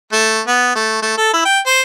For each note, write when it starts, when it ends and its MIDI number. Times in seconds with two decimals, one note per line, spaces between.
0.12 0.40 57
0.47 0.75 59
0.75 0.98 57
1.02 1.17 57
1.17 1.33 69
1.33 1.45 64
1.45 1.59 79
1.66 1.81 72